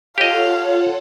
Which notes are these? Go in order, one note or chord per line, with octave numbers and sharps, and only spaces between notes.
F4 G4 A4 C#5 D#5 F5 F#5